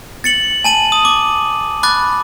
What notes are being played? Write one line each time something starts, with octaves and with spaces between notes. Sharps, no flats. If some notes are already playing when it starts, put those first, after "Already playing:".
A6 C#7 F#7
G#5 A5 D#7 F#7
D#6
D6
B5 D6 F#6 A6